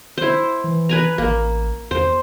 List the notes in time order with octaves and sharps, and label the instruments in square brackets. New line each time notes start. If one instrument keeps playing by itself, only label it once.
[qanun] E4 C5
[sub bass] E3
[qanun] B4 G#5 A#5
[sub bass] A1 [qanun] A#3
[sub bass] E2 [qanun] C5